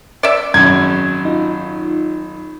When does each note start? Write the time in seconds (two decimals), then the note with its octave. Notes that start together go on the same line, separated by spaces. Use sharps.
0.23 D5 E5
0.54 G#1 F#2 G#6
1.25 D#4 F4